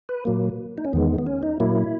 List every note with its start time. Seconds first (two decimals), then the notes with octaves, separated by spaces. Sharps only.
0.09 B4
0.25 A#2 F#3 A#3
0.78 D#4
0.85 C#4
0.93 E2 D#3 G#3 B3
1.18 B3
1.27 C#4
1.43 D#4
1.60 A#2 F#3 A#3 E4